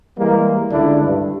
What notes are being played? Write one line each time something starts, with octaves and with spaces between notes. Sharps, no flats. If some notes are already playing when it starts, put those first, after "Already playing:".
E3 G3 G#3 A#3
C#2 D3 D4 E4
G2